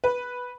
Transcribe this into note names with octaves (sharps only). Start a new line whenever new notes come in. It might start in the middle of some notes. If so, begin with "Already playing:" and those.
B4